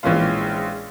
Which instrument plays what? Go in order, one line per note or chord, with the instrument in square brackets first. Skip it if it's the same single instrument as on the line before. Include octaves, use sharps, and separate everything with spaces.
[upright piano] A#1 E3 G#3 C#4 F4